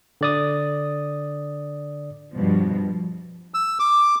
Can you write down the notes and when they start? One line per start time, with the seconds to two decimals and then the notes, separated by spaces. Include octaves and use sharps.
0.21 D3 D5 D#6
2.32 G2 B2 F3
3.54 E6
3.79 D6